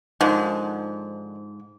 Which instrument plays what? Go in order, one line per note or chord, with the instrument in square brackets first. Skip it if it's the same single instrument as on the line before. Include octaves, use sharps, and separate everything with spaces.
[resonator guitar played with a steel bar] G#2 [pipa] D3 D#3 F3